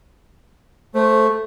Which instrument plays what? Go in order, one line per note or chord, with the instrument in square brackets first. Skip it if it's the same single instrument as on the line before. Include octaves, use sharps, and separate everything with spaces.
[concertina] A3 [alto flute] C5